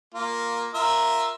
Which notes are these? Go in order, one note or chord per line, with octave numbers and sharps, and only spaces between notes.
A#3 F4
F4 A#4 E5